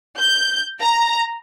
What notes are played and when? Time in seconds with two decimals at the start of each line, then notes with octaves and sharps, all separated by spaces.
0.18 G6
0.81 A#5